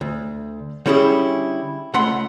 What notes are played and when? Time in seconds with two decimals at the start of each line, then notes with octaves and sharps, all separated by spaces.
0.01 D2
0.86 D3 G3 C#4 E4 G4 G#4
1.94 C#2 A3 F#5 B5 C6